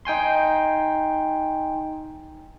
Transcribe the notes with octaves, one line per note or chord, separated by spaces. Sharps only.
D#4 G5 G#5 C6